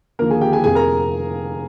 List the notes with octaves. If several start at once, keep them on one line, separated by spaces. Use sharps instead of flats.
D#2 D3 F3 A#3 A#4
G#4 G#5
G4 G5
G#4 G#5
F1 F2 C3 G#4 G#5
A#4 A#5